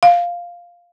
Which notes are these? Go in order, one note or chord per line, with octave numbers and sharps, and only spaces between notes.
F5